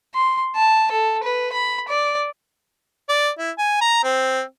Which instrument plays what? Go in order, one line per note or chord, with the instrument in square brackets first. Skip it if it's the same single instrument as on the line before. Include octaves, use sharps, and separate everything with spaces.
[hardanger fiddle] C6
A5
A4
B4
B5
D5
[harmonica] D5
E4
G#5
A#5
C4